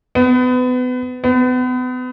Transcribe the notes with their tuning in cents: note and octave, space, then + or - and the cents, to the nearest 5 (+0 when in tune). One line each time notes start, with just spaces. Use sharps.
B3 +30
B3 +35